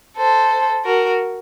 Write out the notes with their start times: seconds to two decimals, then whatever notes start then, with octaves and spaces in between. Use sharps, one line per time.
0.17 A4 C5
0.84 F#4 A#4